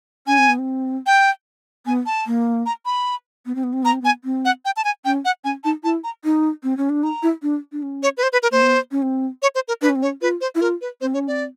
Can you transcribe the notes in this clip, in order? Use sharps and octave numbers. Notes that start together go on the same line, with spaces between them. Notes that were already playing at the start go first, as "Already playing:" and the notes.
C#4 G#5
C4
B3
C4
G5
B3 G#5
A5
A#3
A#5
B5
B3
C4
B3
C4
B3 A#5
C4
B3
G#5
C4
F#5
G5
A5
G#5
C#4 G5
F#5
C#4 G#5
D#4 A5
E4 A5
A#5
D#4
C4
C#4
D4
D#4 A#5
E4
D4
D4
C#4
C#5
B4
C5
B4
A#4
A#3 C5
B3
C#4
C4
C#5
C5
A#4
D4 B4
C#4
C4
C#4 C#5
F4 B4
C5
E4
F4 A#4
B4
C4 C5
C#4 C#5
C4 D5